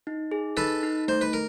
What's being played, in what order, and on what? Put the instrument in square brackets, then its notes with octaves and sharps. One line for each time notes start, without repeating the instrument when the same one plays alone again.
[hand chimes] D#4
G#4
[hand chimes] D#4 [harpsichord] A4 B4
[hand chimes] D#4
[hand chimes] A3 [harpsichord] C5
[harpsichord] B4
A#4